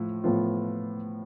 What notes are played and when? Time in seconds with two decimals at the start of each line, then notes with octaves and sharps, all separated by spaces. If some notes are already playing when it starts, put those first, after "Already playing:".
Already playing: A2 F3
0.24 A2 F3 B3 F4